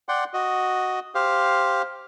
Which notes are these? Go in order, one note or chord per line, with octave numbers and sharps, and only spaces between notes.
D5 F#5 G5 C6
F#4 D#5
G4 C5 F5